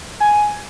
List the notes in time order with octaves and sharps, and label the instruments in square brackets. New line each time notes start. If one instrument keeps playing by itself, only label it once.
[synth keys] G#5